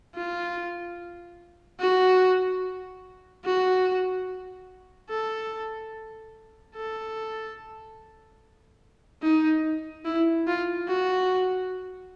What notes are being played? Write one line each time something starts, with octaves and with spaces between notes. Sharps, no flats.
F4
F#4
F#4
A4
A4
D#4
E4
F4
F#4